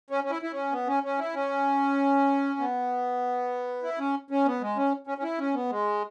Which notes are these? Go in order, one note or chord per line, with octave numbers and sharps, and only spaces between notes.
C#4
C#4
E4
E4
C#4
B3
C#4
C#4
E4
C#4
B3
E4
C#4
C#4
B3
G#3
C#4
C#4
C#4
E4
C#4
B3
G#3